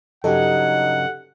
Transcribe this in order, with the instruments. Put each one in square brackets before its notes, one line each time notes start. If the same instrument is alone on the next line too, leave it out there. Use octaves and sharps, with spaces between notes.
[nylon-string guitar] G2 C#3 F#3 [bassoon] D#4 [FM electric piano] G4 A4 [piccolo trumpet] F#5